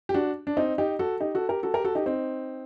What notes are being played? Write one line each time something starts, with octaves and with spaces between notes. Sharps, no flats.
G4
D4 F#4
D4
C4 D#4
D#4 G4
F#4 A4
D#4 G4
F#4 A4
G4 A#4
F#4 A4
G4 A#4
F#4 A4
D#4 G4
C4 D#4